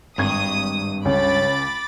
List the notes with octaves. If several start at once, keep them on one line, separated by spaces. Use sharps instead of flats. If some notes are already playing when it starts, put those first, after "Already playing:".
G#1 G2 C#6 D#6 G#6
C#2 C#5 B5 D6 A6